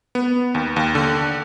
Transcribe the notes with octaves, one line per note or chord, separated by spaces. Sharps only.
B3
D#2
D#2
D3